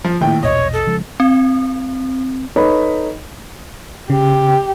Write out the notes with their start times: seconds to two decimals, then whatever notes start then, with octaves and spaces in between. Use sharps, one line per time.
0.04 F3
0.21 A#1 A2 D#3 G5
0.43 A#1 E2 B2 C#5 D#5
0.73 A4
0.87 C#3 F3 G#3
1.20 C4
2.56 D#4 A4 B4 C#5 D#5 B5
4.10 C#3 G4